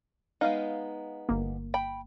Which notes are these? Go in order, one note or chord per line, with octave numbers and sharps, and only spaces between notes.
G#3 B3 D#4 F5
G1 A#3
G5 B5